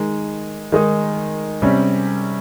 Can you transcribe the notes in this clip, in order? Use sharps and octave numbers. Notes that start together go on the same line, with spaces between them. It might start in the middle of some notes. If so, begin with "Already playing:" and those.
Already playing: D#3 G#3 D#4
D#3 G#3 D#4
C3 G3 C#4